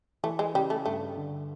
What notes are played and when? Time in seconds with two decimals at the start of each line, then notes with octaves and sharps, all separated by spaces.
0.23 E3 A3
0.39 G#3
0.54 C#3 G3
0.70 A3
0.86 G2 A3
1.17 D3